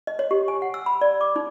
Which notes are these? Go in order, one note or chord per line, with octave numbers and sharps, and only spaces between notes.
D#5
C#5
G4
G#5
F#5
E6
B5
D5
D6
D#4